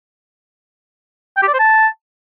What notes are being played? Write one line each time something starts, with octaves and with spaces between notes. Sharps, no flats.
G5
G4
D5
C5
A5